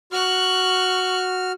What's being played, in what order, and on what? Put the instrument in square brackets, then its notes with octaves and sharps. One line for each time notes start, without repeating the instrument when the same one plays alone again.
[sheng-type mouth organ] F#4 F6 [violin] C#6 F#6